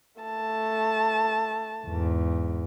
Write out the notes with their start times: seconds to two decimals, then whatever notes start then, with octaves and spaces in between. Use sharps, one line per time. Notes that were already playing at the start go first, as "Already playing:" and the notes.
0.22 A3 A5
1.84 E2 G#2